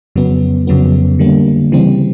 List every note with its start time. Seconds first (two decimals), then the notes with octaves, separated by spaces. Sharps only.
0.16 F2 C#3 F#3 B3
0.67 F2 C#3 F#3 B3
1.19 D3 G3 A#3
1.72 C#3 E3 G3 C4